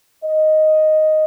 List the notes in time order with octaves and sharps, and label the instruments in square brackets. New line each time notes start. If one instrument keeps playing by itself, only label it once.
[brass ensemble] D#5